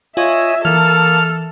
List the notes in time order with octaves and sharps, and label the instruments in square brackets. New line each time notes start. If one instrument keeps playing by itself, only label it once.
[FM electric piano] F4 [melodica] C#5 D#5 G#5 [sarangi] E5
[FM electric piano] E3 [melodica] A#3 [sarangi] A4 [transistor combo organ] F6